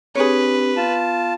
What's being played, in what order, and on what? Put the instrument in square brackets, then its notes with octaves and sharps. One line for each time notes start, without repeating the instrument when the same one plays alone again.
[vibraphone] C4 D4 G4 [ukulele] G#4 C#5 [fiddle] B4
[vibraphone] B3 [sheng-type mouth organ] F4 A5